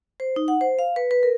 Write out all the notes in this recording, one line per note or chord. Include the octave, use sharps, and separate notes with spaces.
C5
D#4
F#5
C5
F5
B4
B4
A#4